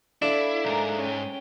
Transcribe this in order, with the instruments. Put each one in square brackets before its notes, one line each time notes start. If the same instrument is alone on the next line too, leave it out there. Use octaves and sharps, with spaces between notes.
[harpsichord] D4 [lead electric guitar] E4 [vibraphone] A4 E5 F5
[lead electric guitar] B1 G#2 [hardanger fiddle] A#4 A#5
[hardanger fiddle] C#4 G5